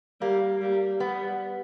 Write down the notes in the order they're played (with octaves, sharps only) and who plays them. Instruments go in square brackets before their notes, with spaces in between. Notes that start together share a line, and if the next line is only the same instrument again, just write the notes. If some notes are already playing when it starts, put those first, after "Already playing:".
[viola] G3 [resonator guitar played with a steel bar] A#3
[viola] G3
[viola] G3 [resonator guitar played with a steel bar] B3